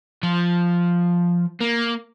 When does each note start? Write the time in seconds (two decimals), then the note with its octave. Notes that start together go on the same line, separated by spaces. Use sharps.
0.23 F3
1.60 A#3